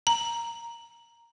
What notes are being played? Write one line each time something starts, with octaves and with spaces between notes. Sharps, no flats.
A#5